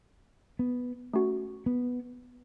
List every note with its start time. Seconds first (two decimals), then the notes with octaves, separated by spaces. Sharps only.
0.59 B3
1.14 A3 C#4 F#4
1.66 B3